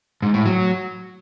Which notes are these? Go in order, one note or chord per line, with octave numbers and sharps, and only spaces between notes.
G#2
A2
F#3